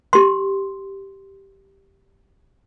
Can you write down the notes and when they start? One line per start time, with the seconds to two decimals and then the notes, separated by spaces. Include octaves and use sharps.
0.13 G4 C6